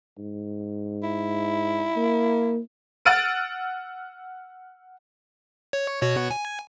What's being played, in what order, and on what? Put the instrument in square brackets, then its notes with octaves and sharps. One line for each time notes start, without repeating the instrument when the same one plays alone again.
[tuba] G#2
[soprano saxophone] E4
[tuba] A#3
[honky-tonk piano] F#5 E6 F6 A6 D7 D#7
[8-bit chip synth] C#5
B2 F#4 C#5
G#5